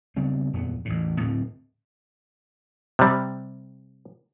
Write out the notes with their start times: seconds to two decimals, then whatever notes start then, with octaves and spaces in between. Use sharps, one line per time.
0.16 C#3 G3 B3 C4
0.53 D#1 F2 B3
0.85 A1 E2 A2
1.20 D1 A2 D3 C4
2.99 C3 G3